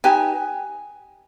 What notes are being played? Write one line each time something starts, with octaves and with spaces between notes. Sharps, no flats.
D#4 G4 B4 G#5